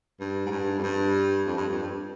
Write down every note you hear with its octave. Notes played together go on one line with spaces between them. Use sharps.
G2
G#2
G2
F2
G2
F2
G2
F2
G2